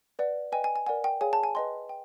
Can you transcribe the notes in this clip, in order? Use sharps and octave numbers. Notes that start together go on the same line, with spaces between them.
B4 D5 F#5
B4 D#5 G5 G#5
G#5
G#5
A#4 D5 F#5 G#5
G5
G#4 C#5 F5 G#5
A5
G#5
B4 D#5 G5 C6
G5